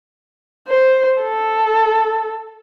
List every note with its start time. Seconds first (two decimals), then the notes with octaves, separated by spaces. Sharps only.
0.68 C5
1.21 A4